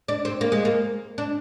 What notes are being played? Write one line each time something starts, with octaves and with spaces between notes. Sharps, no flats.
D4
C4
A#3
G#3
A#3
D4